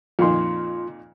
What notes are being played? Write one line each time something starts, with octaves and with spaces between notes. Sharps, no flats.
F2 A#2 D#3 F4 C6